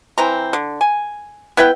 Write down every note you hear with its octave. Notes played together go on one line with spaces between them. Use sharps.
E3 C4 A#5
D3
G#5
B3 E4 B4 G5